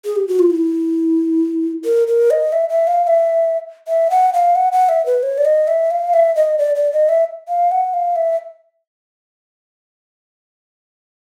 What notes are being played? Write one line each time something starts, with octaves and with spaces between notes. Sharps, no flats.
G#4
G4
F#4
F4
E4
A#4
A#4
D#5
E5
E5
F5
F5
E5
E5
F#5
F5
F#5
F#5
E5
B4
C#5
D5
D#5
E5
F5
E5
D#5
D5
D5
D#5
E5
F5
F#5
F5
E5